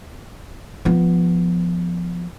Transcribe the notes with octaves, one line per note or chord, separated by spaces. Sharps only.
F3 B3